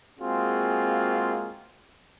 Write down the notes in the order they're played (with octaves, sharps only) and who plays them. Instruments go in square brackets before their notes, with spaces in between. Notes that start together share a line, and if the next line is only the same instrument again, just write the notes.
[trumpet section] G#3 A#3 C4 F4 F#4 G#4